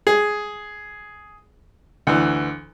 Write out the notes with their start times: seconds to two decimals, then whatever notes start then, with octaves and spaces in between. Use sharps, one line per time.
0.07 G#4
2.07 D2 E3